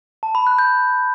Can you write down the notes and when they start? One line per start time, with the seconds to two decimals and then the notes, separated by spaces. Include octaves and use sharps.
0.23 A5
0.35 B5
0.47 F#6
0.59 G6